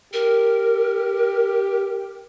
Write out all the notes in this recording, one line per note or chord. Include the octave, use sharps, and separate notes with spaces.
G4 A#4